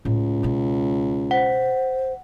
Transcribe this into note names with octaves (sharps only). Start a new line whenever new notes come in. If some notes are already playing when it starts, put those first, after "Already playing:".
C#2 A2
B2 C#4
C5 F#5